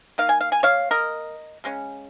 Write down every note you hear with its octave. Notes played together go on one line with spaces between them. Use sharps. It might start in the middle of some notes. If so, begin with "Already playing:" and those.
D#3 A#3 F5
G#5
F5
G#5
C#5 F5
A#4 D#5
C#3 G#3 C#4